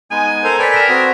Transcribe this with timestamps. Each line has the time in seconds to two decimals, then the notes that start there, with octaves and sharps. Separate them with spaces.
0.11 G#3 B3 D#4 G#5
0.44 A4 A#4 C5
0.59 A4 B4 D5 G5 G#5 G#6 B6
0.74 A#4 B6 E7
0.89 C4 F#4 D#6